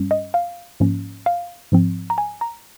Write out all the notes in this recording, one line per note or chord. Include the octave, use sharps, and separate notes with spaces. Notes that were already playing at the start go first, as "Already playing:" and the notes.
Already playing: G2 G3 C#4
D#5
F5
G#2 F3 A#3 C#4
F5
G#2 F3 C4
A#5
G#5
A#5